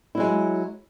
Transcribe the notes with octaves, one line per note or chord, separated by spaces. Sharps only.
F#3 G#3 E4